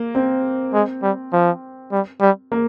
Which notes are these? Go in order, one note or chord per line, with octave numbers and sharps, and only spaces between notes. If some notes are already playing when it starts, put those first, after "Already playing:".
Already playing: A#3
C4
G#3
G3
F3
G3
G3
A#3